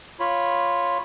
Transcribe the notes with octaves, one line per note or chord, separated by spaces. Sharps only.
F4 C#5 B5